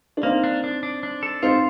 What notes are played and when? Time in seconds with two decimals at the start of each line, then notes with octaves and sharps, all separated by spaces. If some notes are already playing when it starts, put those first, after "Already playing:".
0.17 D4
0.23 A#3 C4 D#4
0.44 D4
0.64 D4
0.83 D4
1.03 D4
1.23 A4
1.42 C4 D#4 F4